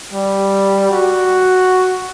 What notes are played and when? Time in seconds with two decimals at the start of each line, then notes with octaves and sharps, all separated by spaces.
0.12 G3
0.90 F#4